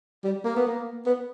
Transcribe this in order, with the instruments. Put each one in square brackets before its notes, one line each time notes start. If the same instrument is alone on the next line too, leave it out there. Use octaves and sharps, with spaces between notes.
[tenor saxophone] G3
A#3
B3
A#3
B3